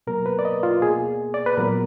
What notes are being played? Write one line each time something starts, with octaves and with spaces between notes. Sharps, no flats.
B2 F#3 A#3 A#4
B4
D5
D#5
F4
B2 A#3 G#4
D5
B4
A#2 F#3 B3 A#4